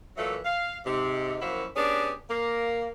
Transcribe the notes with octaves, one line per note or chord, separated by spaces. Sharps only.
A#2 E3 F#3 A3 A#3
F5
G#2 C3
F#2 F3 A#3 E4 F#4
B3 C#4 D4 G4 G#4
A#3